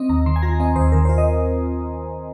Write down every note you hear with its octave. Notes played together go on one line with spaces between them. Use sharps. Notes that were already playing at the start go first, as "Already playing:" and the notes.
Already playing: C4 D#5
D#2 A#5
D#3 C6
G#5
F4 A#5
C4 D#5
D#2 C5
D#3 A#4
F4 C5
D#5